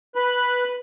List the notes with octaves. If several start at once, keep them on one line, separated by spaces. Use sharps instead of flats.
B4 B5